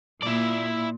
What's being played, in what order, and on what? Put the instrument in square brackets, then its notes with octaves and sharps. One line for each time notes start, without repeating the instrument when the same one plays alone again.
[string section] A#2 [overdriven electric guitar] E4 D5